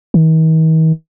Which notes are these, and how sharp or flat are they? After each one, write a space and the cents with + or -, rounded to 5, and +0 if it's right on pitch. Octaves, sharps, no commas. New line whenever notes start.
D#3 +45